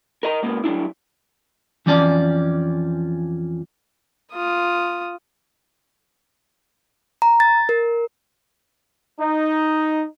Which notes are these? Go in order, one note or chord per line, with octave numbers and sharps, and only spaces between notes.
A#4 D#5 A#5
C#2 A#3 B3
F#3 G3 D4 E4
F2 E3 F3 C#4 D5 A5
F4 D#6
A#5
A6
A#4
D#4